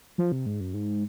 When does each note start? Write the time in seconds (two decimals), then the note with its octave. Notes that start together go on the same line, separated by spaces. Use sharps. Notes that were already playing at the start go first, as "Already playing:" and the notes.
0.18 F3
0.32 C3
0.46 G#2
0.60 F#2
0.74 G#2